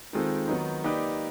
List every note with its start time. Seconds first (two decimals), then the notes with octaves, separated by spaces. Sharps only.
0.13 D#3 G#3 C4 F4 A4
0.48 D#3 F#3 B3 D#4
0.84 A#3 D#4 G4 B4 D5